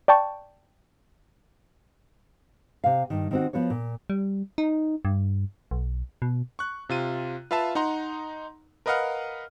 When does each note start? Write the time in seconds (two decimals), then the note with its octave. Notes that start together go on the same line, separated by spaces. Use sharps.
0.08 D5 G5 A5 C#6
2.84 C3 F5
3.10 G2 D#3
3.31 D#3 C4 F#4
3.53 F3 B3 F#4 C#5
3.70 A#2
4.10 G3
4.58 D#4
5.05 G2
5.71 B1
6.22 B2
6.59 C#6 F#6
6.89 C3 F4 D#7
7.51 F4 B4 E5 F5 A5
7.75 D#4 F#5 A#5 C6
8.86 A#4 B4 D#5 F5 F#5 F6